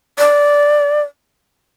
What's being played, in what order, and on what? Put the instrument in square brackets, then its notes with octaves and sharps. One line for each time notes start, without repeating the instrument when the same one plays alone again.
[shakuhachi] D5